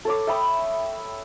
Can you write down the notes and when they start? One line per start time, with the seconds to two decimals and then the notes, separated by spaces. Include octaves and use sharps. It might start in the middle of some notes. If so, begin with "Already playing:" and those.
0.05 A4 C#5 D6
0.27 E5 G5 B5 D#6